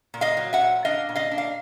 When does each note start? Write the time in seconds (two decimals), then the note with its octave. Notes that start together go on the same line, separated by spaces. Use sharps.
0.14 A#2
0.21 D#5 F5
0.37 F#3
0.53 E5 F#5
0.62 A#2
0.85 D4 D#5 F5
1.09 A#2
1.15 D#5 F5
1.31 D4
1.38 F5